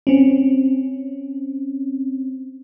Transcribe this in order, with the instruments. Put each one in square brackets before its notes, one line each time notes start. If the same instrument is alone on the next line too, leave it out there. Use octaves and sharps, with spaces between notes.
[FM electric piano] C4 C#4